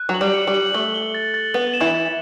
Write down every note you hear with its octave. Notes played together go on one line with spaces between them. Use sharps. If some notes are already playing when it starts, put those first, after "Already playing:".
Already playing: F#6
F#3
F#7
G3
C#7
G3
F#7
A3 G7
G7
A6
A6
B3 A6
E7
E3 E4
A6